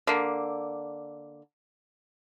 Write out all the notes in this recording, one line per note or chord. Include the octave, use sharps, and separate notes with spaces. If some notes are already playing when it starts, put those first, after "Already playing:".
D3 A#3